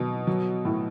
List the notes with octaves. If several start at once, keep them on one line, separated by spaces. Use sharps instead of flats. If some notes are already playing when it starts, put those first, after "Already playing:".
Already playing: B2 F#3
F#3
A2